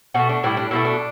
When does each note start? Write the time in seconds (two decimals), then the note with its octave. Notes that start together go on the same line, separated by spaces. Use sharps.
0.14 B2 A3 F#4
0.29 D4
0.44 A2 G3 E4
0.57 D4
0.71 B2 F#3 A3 E4
0.85 D4